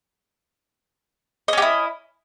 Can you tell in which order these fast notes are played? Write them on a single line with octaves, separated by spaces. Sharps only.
D#5 C#4 G4 E4